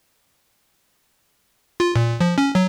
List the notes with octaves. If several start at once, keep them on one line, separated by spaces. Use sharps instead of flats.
F4
A#2
F3
C#4
F#3